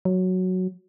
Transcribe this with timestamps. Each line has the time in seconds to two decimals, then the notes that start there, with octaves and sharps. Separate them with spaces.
0.05 F#3